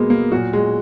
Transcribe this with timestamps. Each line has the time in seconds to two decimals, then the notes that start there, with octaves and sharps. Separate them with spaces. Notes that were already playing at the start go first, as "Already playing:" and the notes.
Already playing: B2 F#3 G#3 A#3 B3
0.10 A#3
0.32 A#2 F#3 F#4
0.53 G#3